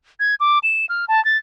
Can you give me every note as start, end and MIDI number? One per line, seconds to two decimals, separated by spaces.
0.20 0.35 92
0.40 0.59 86
0.63 0.85 100
0.89 1.05 89
1.08 1.23 81
1.25 1.37 93